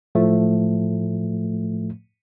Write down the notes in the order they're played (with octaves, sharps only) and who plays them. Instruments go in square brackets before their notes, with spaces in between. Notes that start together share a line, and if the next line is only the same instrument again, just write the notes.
[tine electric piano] A2 F3 A3